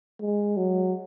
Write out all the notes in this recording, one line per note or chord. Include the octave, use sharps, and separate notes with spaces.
G#3
F#3